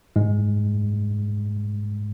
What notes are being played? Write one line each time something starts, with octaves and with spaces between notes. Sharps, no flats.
G#2 G#3